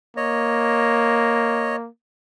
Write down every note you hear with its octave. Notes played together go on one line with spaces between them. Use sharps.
A#3 C#5 D#5